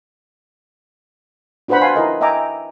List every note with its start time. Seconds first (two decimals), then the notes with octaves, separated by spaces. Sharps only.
1.68 D4 F#4 B4 C5 F#5 B5
1.81 F5 G#5 A5 C6
1.96 E4 A#4 D#5
2.21 D#5 E5 G5 G#5 A#5 D6